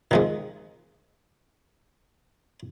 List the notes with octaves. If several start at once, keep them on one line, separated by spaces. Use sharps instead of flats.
D#3 F3 G#3